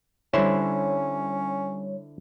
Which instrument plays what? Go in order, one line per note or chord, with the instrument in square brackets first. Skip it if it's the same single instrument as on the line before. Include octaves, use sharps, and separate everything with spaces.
[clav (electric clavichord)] D3 E4 C5 [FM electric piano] G3 C#5 [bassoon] C#4